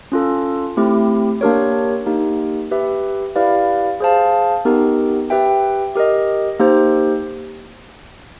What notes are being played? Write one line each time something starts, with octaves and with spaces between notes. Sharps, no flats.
C#4 F4 A4
A3 C4 E4 G4
A#3 D4 G4 A#4 C#5
A#3 D#4 G4
G4 B4 E5
E4 G4 B4 D5 F5
G#4 C5 F5 A5
B3 D#4 G4 A#4
G4 B4 E5 G5
G4 A#4 D#5
A#3 D#4 G4 C5